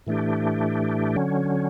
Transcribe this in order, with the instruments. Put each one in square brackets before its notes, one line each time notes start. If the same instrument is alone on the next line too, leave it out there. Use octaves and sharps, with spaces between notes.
[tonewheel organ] A2 E3 A3 D4 G4
D3 F#3 C#4